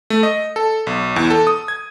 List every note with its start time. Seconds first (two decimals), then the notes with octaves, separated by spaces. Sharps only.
0.10 A3
0.23 D#5
0.56 A4
0.87 B1
1.16 E2
1.30 A4
1.47 D#6
1.68 G#6